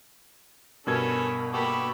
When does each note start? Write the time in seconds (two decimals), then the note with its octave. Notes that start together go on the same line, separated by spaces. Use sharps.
0.87 G2 B2 C#4 A4 A#4 B5 G#6
1.53 A#3 F#4 G4 A4 B5